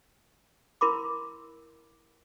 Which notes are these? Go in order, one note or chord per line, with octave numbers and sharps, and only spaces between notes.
E4 A#4 B5 C6 D6